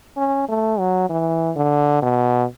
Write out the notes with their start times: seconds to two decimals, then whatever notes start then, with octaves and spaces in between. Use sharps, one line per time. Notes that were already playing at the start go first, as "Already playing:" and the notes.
0.17 C#4
0.49 A3
0.79 F#3
1.10 E3
1.56 D3
2.02 B2